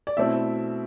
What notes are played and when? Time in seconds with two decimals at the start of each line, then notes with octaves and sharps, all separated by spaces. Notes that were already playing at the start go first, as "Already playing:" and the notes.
0.07 D5
0.17 B2 A3 C4 E4 E5